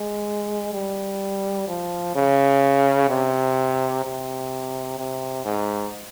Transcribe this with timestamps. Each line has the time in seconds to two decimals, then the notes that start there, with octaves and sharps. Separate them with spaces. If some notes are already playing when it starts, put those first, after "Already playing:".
Already playing: G#3
0.73 G3
1.68 F3
2.16 C#3
3.09 C3
4.04 C3
4.98 C3
5.45 G#2